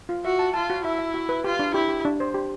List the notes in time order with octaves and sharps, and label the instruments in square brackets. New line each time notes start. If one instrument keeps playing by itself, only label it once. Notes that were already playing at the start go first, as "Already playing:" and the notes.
[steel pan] F4
[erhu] F#4 [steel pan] E5
[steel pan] A5
[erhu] F4 [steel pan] A5
[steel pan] F#4
[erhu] E4 [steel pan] E5
[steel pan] E5
F#4
B4
[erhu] F4 [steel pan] G4
[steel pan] D4
[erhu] E4 [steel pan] G4
[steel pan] G4
D4
C5
G4